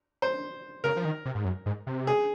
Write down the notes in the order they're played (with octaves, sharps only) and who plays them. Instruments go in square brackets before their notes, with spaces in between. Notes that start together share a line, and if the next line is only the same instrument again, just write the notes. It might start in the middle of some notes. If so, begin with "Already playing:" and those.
[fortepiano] C5
[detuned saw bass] C#3 [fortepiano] A#4
[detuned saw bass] F3
D#3
C3
G#2
F#2
G#2
C3
[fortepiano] G#4